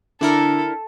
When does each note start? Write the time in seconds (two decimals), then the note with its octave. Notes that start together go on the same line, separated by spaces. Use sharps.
0.21 D3 D4 E4 A4 A#4